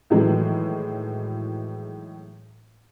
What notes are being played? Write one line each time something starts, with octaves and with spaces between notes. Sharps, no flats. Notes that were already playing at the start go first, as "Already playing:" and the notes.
A2 D#3 E3 F#3 G#3